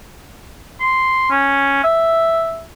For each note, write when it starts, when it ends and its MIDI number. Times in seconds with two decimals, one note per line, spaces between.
0.81 1.28 84
1.30 1.80 61
1.84 2.63 76